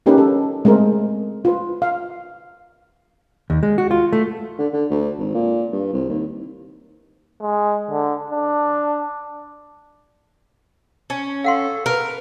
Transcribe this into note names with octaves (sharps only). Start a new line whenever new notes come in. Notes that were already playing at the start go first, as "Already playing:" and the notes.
A#3 C#4 D#4 G4 A#4 B4
A4
G#3 A3 C4 A#4 C5
F4 B4
F5
D#2
G#3
F#4
F4
A3
D3
D3
D2
G#1
A#2
G2
C2
D#2
G#3
D3
D4
C#4
A4 F5 F#5 C6
A#4 B4